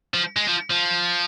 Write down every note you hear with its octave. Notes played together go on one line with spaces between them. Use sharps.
F3
G#3
F3
F3